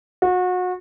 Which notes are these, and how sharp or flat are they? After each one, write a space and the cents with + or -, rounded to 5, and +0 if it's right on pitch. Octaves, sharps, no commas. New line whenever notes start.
F#4 -30